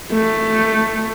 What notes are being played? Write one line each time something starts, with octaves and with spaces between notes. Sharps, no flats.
A3